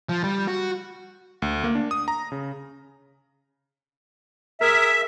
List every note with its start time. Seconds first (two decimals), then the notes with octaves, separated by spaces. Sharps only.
0.09 F3
0.24 G3
0.48 F#4
1.42 D2
1.64 A#3
1.75 D4
1.91 D#6
2.08 A#5
2.32 C#3
4.61 G#4 A#4 E5